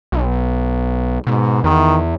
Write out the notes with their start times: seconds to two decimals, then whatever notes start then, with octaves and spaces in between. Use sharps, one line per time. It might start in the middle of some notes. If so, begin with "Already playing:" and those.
0.12 B1
1.27 G#2 B2
1.64 E2 D#3